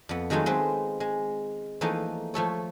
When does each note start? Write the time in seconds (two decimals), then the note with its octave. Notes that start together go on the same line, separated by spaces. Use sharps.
0.09 F2 B3
0.30 D#3 F#3 G#3 A3 D#4 F4
0.46 G#3 C4 B4
1.00 G#3
1.81 E3 F3 A3 A#3 D#4
2.34 F3 A3 A4 C#5